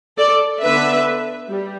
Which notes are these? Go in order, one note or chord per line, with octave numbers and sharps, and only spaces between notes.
A4 D5
D3 B3 D4 B4 E5
G3